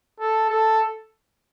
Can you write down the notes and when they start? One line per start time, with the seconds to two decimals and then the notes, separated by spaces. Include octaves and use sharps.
0.20 A4
0.50 A4